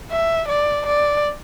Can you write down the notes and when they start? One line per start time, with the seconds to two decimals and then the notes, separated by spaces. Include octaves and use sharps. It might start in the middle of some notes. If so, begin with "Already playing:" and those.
0.11 E5
0.49 D5
0.87 D5